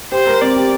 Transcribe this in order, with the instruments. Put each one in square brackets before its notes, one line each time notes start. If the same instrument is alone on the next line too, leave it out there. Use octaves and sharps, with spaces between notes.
[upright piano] G4 [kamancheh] C5
[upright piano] A#4
[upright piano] C4 [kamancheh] D5
[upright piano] G4